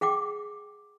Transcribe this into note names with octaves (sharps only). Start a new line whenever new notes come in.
G#4 F#5 G5 D6